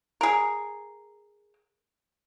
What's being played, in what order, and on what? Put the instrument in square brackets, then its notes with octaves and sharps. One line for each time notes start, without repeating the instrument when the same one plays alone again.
[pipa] G#4 A#4